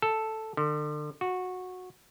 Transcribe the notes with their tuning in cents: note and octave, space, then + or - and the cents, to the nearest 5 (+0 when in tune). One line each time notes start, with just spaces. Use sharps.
A4 +0
D3 +35
F#4 -15